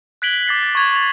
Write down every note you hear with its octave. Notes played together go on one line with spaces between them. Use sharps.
F#6 G#6 B6 D7 F#7 G7
D6 A6 C7
A6
C#6 G#6 F7
G#6 A6 F7